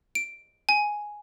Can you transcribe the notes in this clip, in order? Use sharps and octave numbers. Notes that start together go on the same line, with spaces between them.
D7
G#5